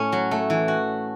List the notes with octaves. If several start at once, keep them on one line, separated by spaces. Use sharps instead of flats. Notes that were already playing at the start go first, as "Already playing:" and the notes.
Already playing: A2 A3 C#4
F#3
A3
E3
F#4